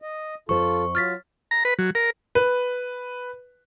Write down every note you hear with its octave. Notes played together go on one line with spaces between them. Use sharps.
D#5
F2 F4 A4 C5 C#6
F#3 F4 F6 A6 B6
A#5
B4
F#3
A#4
B4